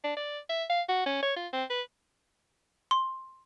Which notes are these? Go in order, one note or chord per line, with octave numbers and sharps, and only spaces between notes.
D4
D5
E5
F5
F#4
C#4
C#5
F4
C4
B4
C6